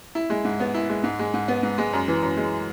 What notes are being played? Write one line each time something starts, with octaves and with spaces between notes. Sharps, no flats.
E4
G#3
G#2
B3
E4
G#3
G#2
G#3
G#2
B3
G#2
G#3
F#2
E3
F#2
G#3